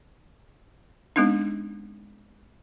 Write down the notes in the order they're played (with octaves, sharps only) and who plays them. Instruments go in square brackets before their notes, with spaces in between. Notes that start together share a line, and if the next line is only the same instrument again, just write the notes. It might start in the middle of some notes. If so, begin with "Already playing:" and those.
[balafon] G#3 B3 C4 D4 D#4